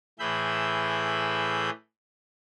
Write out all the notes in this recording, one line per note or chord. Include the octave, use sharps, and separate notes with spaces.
A2 E3 G#4 E5 B5 G6